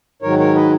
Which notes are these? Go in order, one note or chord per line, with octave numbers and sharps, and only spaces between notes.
G#2 D#3 F#3 A#4 C#5
A#4 C#5
B4 D#5